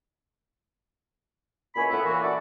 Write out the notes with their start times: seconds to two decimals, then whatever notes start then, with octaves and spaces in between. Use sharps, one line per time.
1.75 C#2 A#2 E4 C#5 G#5 B5
1.91 A2 B3 E4
2.04 A#2 E3 F#4
2.22 C#4 E4 F#4 A4 D5